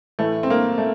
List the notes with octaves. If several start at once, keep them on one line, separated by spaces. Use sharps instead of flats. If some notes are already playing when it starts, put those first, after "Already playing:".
A2 E3 A3
C4
A#3
A3